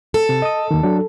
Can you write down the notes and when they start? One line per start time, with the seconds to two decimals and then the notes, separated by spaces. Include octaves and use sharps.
0.14 A4
0.29 C3
0.42 D#5 D#6
0.71 D#2 D#3
0.83 F#3 D4